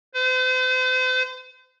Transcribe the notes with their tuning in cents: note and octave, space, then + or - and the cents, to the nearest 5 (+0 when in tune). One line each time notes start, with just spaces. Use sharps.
C5 -40